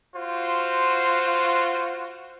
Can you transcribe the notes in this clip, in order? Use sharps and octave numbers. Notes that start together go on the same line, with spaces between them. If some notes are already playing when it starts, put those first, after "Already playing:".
F4 F#4 C5